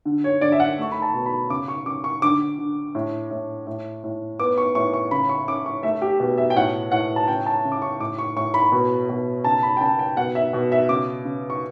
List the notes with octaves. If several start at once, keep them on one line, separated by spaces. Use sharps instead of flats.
D3
C#5
D3 D5
E5
F#5
A3 C#6
B5
A5
B2
B5
C#3 D6
C#6
C#3 D6
C#6
D3 D6
D3
A2
A2
A2
A2
B3 D6
C#6
A2 C#6
C#6
C#3 B5
C#6
C#3 D6
C#6
A3 E5
G4
B2
E5
G5
A2 F#5
A2 F#5
A5
C#3 G5
A5
C#3
D6
C#6
A2 D6
C#6
A2 C#6
B5
B2
B2
C#3 A5
B5
G5
C#3 A5
G5
B2 F#5
E5
B2
E5
C#3 D6
C#3
C#6